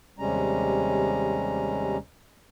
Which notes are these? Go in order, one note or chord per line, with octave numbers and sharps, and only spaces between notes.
D#2 C3 G3 G#3 C#4 A#5